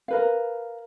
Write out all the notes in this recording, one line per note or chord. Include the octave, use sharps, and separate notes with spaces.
A#4 B4 F5